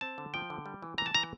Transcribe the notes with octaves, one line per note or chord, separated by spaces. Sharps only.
C4 A5
D3
F3 G5
D3
G3
E3
E3 A#5
A5
E3 A#5